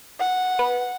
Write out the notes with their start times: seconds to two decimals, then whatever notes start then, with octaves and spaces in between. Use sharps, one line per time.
0.20 F#5
0.59 B4